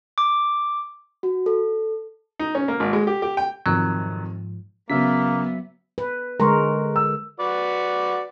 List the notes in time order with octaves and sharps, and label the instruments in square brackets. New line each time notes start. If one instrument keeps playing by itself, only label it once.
[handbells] D6
[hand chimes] F#4
A4
[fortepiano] D#4
C#4
A#3
G#1
G#3
G4
G4
G5
[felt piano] F2 C3 D#3 [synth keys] G#2 F3 [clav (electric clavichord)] F#3
[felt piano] C#3 [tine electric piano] F#3 E5 B6 [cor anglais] A#3 [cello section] B3
[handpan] B4
[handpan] D3 G#3 A#4 [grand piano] A#5 C6 C#6
[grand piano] E6
[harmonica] F#4 B4 D5